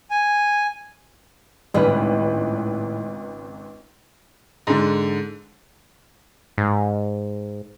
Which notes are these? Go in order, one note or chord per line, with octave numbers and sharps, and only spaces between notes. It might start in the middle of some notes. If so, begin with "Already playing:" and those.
G#5
G#1 C#2 A2 G3 B4
G#2 D3
G#2